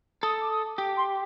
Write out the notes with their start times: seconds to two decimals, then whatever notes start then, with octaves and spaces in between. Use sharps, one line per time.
0.22 A4 D#6
0.41 D6
0.51 D#6
0.78 G4 D6
0.97 C6